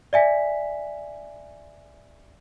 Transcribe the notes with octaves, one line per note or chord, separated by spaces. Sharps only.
D5 E5 G#5 B6